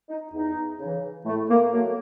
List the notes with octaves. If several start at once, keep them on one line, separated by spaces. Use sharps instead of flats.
D#4
E2 D#4
C#3 E3
A2 A3
A#3
F#3 A3 A#3